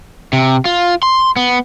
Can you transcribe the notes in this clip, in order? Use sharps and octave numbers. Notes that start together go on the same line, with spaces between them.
C3
F4
C6
B3